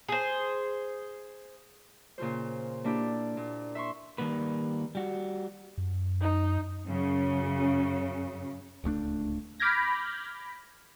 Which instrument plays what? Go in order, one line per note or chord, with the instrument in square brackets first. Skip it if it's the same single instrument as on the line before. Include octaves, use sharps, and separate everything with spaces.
[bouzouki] G#4 C5
[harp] A#2 C#3 F4 C5
A#3 D4 E4 G4
A#2
E5 C6 C#6
[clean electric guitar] D#3 G3 A#3 B4
G3 F#4
[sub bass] F#2
[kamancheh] D#4
[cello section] F#2 C#3
[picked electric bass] D1 C#2 A3 D4
[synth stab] B5 D6 F6 G6 G#6 A#6